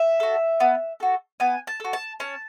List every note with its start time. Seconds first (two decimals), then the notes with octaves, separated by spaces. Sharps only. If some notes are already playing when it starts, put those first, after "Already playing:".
Already playing: E5
0.20 F#4 A4
0.60 B3
1.00 F#4 A4
1.40 B3 G#5
1.67 A5
1.80 F#4 A4
1.93 A5
2.20 C#4 A5